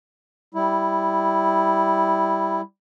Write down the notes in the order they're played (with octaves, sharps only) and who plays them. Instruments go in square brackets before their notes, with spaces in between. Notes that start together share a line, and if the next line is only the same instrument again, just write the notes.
[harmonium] G3 E4